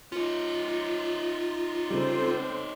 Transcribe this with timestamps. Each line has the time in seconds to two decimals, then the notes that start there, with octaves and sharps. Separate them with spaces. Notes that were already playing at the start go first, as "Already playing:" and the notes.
0.12 C#4 D#4 F4
1.90 C#3 G3 C4 A4 C5